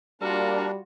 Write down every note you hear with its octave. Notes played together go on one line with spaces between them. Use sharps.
G3 A#3 D4 F4 F#4 A#4